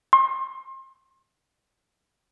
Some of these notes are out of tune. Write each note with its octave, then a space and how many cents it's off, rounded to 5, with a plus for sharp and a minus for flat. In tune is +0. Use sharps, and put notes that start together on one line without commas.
C6 +35